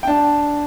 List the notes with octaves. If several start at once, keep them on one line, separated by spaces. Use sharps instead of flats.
G5
D4 A5